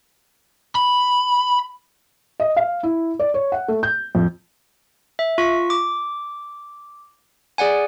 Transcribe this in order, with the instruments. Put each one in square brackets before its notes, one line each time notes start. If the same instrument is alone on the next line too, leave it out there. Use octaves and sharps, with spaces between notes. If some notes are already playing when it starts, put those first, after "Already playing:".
[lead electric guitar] B5
[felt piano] D#5
F5
E4
D5
C#5
F#5
A3
G6
F2
[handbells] E5
F4 C#6 B6
D6
G#4 D5 F#5 G#5